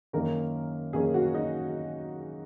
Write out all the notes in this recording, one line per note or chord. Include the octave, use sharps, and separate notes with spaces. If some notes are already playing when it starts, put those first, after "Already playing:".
F#2 D#3 A#3 C#4 A#4
F#2 D#3 A#3 C#4 G#4
F#4
D#4